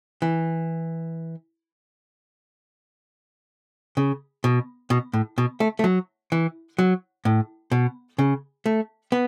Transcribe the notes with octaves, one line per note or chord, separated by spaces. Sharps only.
E3
C#3
B2
B2
A2
B2
A3
A3
F#3
E3
F#3
A2
B2
C#3
A3
B3